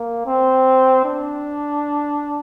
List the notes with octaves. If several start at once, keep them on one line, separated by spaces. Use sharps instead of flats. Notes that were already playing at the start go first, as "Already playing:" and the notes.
Already playing: A#3
C4
D4